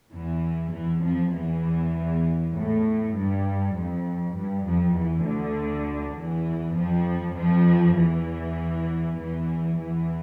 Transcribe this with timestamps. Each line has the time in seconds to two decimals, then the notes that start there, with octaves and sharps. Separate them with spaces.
0.13 E2 E3
0.73 E2 E3
1.03 F2 F3
1.33 E2 E3
2.54 A2
3.14 G2
3.75 F2
4.34 G2
4.65 F2 F3
4.95 E2 E3
5.25 D2 D3
6.16 E2 E3
6.76 F2 F3
7.36 F2 F3
7.97 E2 E3
9.18 E2 E3
9.78 E2 E3